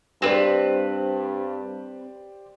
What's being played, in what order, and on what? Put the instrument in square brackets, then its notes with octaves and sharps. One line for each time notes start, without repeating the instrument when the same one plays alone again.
[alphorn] G2 [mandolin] C4 B4 [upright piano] G4 C5 D5